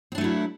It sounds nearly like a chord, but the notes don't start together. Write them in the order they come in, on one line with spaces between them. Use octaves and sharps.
C4 D4 A3 F#3 E4